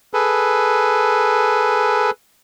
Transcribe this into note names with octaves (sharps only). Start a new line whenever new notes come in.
G#4 A4 B4